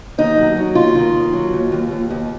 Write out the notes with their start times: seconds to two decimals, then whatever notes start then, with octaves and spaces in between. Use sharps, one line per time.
0.18 D#2 D#4
0.37 F#3
0.57 F#3
0.75 D#2 F4
0.96 D#3
1.15 D#2
1.33 F#3
1.53 D#2
1.72 D#2
1.91 D#2
2.10 D#2